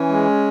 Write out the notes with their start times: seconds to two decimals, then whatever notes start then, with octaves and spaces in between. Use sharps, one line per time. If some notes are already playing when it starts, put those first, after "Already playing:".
Already playing: E3 C#4
0.09 G#3